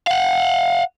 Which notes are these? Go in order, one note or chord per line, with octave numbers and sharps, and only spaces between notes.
F5 F#5